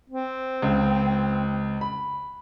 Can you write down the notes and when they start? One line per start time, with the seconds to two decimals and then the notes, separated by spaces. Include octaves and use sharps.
0.10 C4
0.62 C#2
1.81 B5